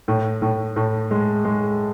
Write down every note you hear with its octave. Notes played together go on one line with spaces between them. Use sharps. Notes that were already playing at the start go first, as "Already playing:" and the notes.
A2
A2
A2
G#3
G#3